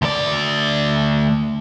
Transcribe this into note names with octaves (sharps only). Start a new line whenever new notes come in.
D2 D5